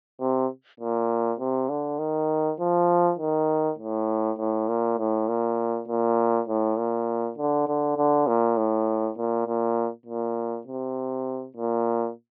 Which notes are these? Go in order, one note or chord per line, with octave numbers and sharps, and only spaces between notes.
C3
A#2
C3
D3
D#3
F3
D#3
A2
A2
A#2
A2
A#2
A#2
A2
A#2
D3
D3
D3
A#2
A2
A#2
A#2
A#2
C3
A#2